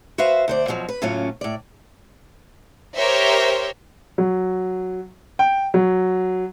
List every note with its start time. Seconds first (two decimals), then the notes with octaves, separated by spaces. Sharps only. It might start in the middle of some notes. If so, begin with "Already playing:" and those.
0.18 F#4 B4 C5 E5 F5
0.48 D2 C5 D5
0.67 F#2 B2 F3 F#3
0.89 B4
1.02 A2 C#3 F#3 A#3 C#4 F4
1.41 A2 D5
2.96 G4 A#4 C5 C#5 E5
4.18 F#3
5.39 G5
5.74 F#3